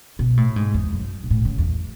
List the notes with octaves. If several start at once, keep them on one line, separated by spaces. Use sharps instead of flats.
B2
A2
G#2
E2
F#2
B2
A2
C#3
E2